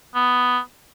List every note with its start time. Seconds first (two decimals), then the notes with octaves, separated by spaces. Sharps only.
0.15 B3